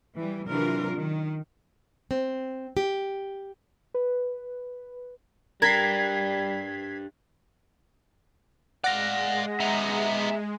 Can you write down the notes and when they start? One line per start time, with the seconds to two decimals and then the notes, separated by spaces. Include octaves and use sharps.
0.15 E3 G3
0.47 C3 E3 F#3 D4 F4 A#4
0.95 D#3
2.11 C4
2.77 G4
3.94 B4
5.62 G3 D4 G4 A#4 G#6 B6 C7
8.84 G#3 D5 F5 F#5 A#6
9.60 B3 D#4 E5 A#5